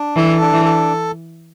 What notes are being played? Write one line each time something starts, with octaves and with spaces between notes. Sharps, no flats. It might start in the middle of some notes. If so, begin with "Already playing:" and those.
Already playing: D4
E3 A4
D4
E3
A4